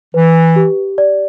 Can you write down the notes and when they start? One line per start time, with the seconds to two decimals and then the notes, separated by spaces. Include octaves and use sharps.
0.14 E3 B4
0.56 G4
0.98 D5